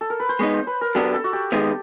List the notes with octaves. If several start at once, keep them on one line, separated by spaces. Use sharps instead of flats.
A4
A#4
B4
C5
G#3 B3 D#4 C#5
C5
B4
A#4
F#3 B3 D4 G4 A4
A4
F#4
G4
D#3 G#3 B3 D#4